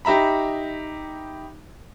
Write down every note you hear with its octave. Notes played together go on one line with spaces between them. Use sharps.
D#4 G4 E5 A#5 B5